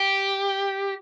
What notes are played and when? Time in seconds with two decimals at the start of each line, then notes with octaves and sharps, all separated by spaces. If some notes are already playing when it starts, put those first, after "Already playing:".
Already playing: G4